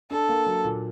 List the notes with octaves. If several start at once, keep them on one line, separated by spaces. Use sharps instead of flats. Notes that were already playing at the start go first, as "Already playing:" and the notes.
D4 A4
A#3
F#3
A#2